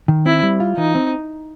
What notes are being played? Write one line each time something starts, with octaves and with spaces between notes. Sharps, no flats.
D#3
C4 E4
G3
F4
E3 D#4
C4